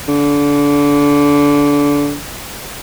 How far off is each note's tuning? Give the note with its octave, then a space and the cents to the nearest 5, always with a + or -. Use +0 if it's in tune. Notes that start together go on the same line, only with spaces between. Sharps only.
D3 -25